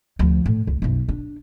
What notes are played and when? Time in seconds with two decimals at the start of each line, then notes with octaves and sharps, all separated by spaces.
0.19 D2 F3
0.46 A2
0.67 C#2
0.82 B1 F#2
1.09 D4